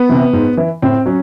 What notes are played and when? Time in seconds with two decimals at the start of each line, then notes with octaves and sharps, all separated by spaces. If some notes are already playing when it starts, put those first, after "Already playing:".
Already playing: B3
0.09 C3 E3
0.33 G#2
0.57 E3
0.82 A2 C4
1.06 F#3 C#4